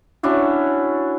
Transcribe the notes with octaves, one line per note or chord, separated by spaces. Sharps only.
C#4 D4 E4 F#4